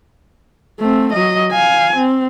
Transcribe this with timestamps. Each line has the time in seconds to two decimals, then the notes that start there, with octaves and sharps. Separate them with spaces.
0.80 A3 C4
1.12 F#3 D#5
1.52 F5 G#5
1.96 C4